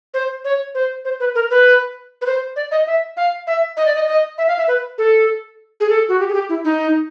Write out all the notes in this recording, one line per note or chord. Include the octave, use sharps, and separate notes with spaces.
C5
C#5
C5
C5
B4
A#4
B4
B4
C5
D5
D#5
E5
F5
E5
D#5
D5
D#5
D#5
E5
F5
E5
B4
A4
G#4
A4
F#4
G4
G#4
G4
E4
D#4